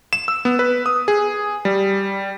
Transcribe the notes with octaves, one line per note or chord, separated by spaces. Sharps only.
E7
E6
B3
B4
D#6
G#4
G3